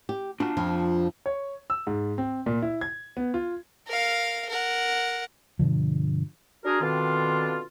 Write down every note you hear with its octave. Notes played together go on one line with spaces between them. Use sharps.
G4
D4 F4 F#4 A5
F2 F3
C#5
E6
G#2
C4
A#2
E4
G#6
B3
F4
A#4 F5
A#4 F#5
G2 B2 D3 F3
D4 F#4 G#4 A#4
B2 D3 D#3 C4 D4 F4